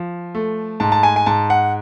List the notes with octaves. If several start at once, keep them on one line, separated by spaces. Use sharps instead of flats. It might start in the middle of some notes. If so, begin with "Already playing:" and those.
Already playing: F3
A3
G#2 A5
A5
G#5
G#5
G#2 A5
F#5